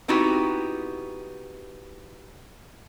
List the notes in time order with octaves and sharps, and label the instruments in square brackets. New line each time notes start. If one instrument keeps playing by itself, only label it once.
[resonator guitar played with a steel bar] B3 C4 D#4 E4 F#4 G4